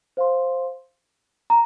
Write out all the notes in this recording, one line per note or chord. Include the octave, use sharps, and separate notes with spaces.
C5 F5 C6
A#5